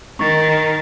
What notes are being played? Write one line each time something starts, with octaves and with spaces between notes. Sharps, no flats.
D#3 C#6 A6 A#6